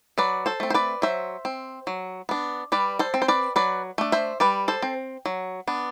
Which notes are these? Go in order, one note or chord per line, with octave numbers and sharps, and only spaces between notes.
F#3 B4 D5
A4 C5
A3 C4
C5
B4 D5
F#3 C5 E5
C4
F#3
B3 D4
G3 B4 D5
A4 C5
C4
C5
B4 D5
F#3 B4 D5
A3 D4
C5 E5
G3 B4 D5
A4 C5
C4
F#3
B3 D4